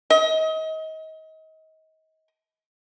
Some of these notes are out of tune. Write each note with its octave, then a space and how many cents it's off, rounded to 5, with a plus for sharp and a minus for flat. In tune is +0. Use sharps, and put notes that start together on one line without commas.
D#5 +30